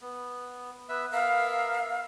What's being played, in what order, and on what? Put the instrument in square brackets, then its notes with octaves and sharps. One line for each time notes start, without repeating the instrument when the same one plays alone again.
[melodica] B3
B3 B4 E5
[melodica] B3 A#4 E5 [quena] F5